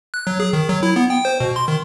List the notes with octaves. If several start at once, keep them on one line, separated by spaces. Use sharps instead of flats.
F#6
F#3
G#4
D#3
F#3
E4
B3
G5
C5
B2
C6
D#3